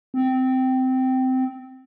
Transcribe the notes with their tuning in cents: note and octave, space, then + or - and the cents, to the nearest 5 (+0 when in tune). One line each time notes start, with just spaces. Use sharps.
C4 -15